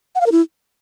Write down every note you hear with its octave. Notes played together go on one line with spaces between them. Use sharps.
F#5
F5
A#4
E4